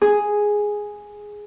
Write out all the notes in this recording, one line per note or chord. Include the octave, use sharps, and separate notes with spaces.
G#4